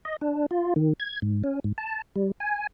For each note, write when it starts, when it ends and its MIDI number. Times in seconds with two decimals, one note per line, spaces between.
0.05 0.16 75
0.21 0.46 62
0.51 0.74 65
0.76 0.93 51
1.00 1.20 92
1.22 1.43 44
1.44 1.60 61
1.64 1.73 44
1.78 2.02 81
2.16 2.31 55
2.40 2.67 80